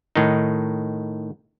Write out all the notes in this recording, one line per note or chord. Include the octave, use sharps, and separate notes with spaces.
A2 D#3 D#4